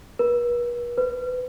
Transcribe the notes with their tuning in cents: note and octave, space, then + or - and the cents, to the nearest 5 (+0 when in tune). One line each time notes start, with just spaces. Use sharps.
B4 -40
B4 +30